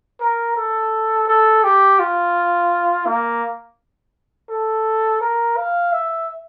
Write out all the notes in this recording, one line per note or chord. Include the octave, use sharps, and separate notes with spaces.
A#4
A4
A4
G4
F4
A#3
A4
A#4
F5
E5